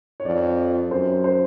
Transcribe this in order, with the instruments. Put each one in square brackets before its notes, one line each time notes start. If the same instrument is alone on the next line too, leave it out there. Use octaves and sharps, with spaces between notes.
[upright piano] C#5
[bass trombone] F2 [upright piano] D5
[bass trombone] F#2 [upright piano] C5
[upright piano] C5